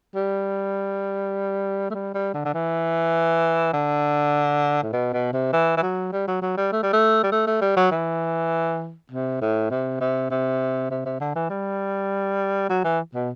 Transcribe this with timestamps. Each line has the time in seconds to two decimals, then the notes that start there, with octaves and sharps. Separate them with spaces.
0.15 G3
1.90 A3
1.95 G3
2.15 G3
2.34 D3
2.45 D3
2.54 E3
3.73 D3
4.83 A2
4.93 B2
5.13 B2
5.33 C3
5.53 E3
5.77 E3
5.83 F#3
6.12 G3
6.28 F#3
6.42 F#3
6.57 G3
6.72 A3
6.83 G3
6.93 A3
7.24 G3
7.32 A3
7.47 A3
7.62 G3
7.77 F#3
7.91 E3
9.12 C3
9.41 A2
9.71 C3
10.01 C3
10.31 C3
10.91 C3
11.05 C3
11.20 D3
11.35 E3
11.50 G3
12.70 F#3
12.84 E3
13.15 B2